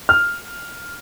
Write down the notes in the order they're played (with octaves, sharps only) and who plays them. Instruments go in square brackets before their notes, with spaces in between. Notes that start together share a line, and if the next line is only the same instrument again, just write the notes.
[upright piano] F6